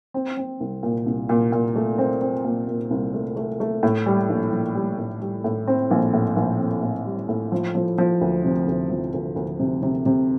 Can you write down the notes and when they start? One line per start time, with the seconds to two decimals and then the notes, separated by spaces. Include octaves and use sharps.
0.14 C4
0.37 C4
0.60 C2
0.83 A#2
1.06 C2
1.29 A#2
1.52 A#2
1.76 A3
1.98 C4
2.22 C4
2.44 A#2
2.67 A#2
2.91 C2
3.14 A3
3.36 A3
3.60 A3
3.83 A2
4.06 G3
4.29 A#1
4.52 A#1
4.75 G3
4.99 A2
5.21 G3
5.44 A2
5.67 C4
5.91 A#1
6.14 A2
6.36 A#1
6.59 C4
6.83 A2
7.06 G3
7.29 A2
7.52 F3
7.75 F3
7.98 F3
8.21 D2
8.44 C3
8.67 D2
8.90 F3
9.13 D2
9.36 D2
9.59 C3
9.83 C3
10.06 C3